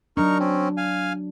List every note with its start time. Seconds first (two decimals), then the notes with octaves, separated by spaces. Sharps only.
0.17 F#3 D4 D#4 A#4 C#6
0.40 C4 C#4
0.77 F5 G#5